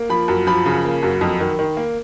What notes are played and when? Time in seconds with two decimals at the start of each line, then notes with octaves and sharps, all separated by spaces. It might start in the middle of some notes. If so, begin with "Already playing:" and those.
Already playing: A#3
0.10 F3 B5
0.28 F#2
0.47 F3 B5
0.66 C#3
0.85 A#3
1.03 F#2
1.21 F2
1.40 D#3
1.59 D#3
1.77 A#3